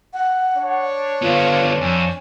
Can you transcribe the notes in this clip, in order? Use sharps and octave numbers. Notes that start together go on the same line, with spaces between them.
F#5
D4 C#5
D3 B3 F4
F2 G#5